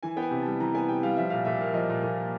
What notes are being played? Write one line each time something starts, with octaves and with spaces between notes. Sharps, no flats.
E3 G#5
B3 G5
G#5
C3
G3 A5
E3 A#5
B3 G#5
C3 G5
G3 F5
F3 E5
A#2 F5
A#2 E5
A#3
F3 D#5
A#2
A#2
A#3